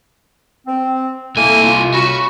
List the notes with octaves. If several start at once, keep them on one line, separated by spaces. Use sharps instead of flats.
C4
C2 A3 A#3 E4 G#5
F4
C#4 F#4 B5 C#6